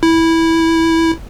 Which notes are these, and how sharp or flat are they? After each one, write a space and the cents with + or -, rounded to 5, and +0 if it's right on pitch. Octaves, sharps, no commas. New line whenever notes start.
E4 -10